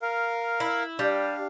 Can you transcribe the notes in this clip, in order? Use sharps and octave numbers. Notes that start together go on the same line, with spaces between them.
A#4 F5
E4
G3 D4 F5